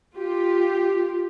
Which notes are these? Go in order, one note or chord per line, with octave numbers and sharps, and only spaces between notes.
F4 G4